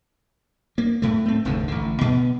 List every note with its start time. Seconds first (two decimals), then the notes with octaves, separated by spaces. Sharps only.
0.78 A#3
1.02 A2 A3
1.26 A3 C4
1.45 F1 D2 G#2 D3
1.68 A1 D3
2.01 B2 B3